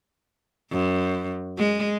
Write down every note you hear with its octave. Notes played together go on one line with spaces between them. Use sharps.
F#2
G#3